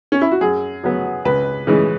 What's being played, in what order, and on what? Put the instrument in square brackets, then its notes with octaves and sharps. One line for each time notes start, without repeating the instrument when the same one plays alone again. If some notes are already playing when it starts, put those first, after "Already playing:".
[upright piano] C#4
E4
F#4
[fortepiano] F#2 [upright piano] G#4
[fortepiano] C#3 F#3 B3
[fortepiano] C#2 [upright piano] B4
[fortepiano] C#3 E3 G#3